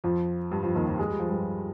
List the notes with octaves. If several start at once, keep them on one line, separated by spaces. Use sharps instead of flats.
F2 F3
G2 G3
F2 F3
D#2 D#3
F2 F3
G#3
G3
F3
G2 G3